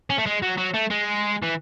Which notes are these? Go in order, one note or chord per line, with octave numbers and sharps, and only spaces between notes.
C#4
A3
G#3
F#3
F#3
A3
G#3
E3